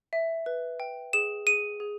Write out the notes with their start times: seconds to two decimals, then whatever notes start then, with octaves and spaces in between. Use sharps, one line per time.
0.13 E5
0.46 B4
0.80 G5
1.13 G#4 E7
1.47 G#4 D#7
1.80 G#4